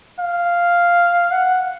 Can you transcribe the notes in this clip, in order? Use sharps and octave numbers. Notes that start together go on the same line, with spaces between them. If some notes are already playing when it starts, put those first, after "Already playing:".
F5
F#5